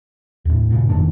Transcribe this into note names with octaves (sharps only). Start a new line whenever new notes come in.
D#2 A2
G2 A#2 C#3
F1 D#3 A#3 D4